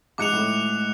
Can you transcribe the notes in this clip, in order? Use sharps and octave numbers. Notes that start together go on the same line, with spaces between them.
G#2 D6 F#6 C#7 F7
A2